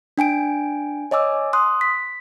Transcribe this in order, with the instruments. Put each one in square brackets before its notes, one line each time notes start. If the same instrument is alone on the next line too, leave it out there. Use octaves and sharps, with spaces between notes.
[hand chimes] D4 G5 G#5 D7
C#5 D#5 G#5 D6 E6
C6 D#6 F#6
B6